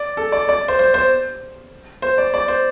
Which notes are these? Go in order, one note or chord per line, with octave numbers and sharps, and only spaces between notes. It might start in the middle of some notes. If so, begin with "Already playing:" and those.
Already playing: D5
A4
D5
D5
C5
C5
C5
C5
D5
D5
C5